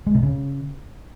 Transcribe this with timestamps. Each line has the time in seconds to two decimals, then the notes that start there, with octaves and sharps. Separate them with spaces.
0.07 G#3
0.15 C3
0.23 C#3